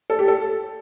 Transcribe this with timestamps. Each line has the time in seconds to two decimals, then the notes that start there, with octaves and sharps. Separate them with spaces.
0.10 A4
0.19 G4
0.28 A4